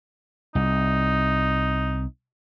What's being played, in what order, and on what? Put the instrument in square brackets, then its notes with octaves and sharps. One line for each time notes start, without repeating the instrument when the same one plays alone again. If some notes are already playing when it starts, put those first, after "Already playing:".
[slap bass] C2 [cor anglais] D#4